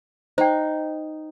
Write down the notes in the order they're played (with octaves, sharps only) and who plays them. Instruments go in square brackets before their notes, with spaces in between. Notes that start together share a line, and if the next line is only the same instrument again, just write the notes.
[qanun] D#4 [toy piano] C5 G5